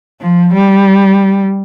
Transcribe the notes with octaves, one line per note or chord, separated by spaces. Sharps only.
F3
G3